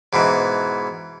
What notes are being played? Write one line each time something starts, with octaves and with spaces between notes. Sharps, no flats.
G#2 B2 E3